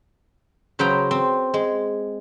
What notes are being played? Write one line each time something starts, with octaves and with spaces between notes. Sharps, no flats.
C#3 F#3 B4 C5 G5 A#5
C4
G#3